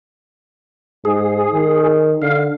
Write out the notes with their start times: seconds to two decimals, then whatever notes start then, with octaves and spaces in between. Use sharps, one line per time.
1.05 G#2 G#4
1.54 D#3
2.22 D3 F5